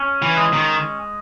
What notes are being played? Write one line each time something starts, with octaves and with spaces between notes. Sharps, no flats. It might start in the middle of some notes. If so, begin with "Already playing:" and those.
Already playing: C#4
E3
G#3
D#3